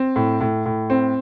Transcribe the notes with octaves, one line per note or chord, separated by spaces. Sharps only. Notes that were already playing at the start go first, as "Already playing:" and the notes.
Already playing: C4
A2
A2
A2
C4